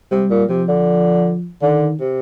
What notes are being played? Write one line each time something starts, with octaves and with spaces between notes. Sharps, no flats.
C3 G3
A#2
C3 F3
D3
D3 D#3
C3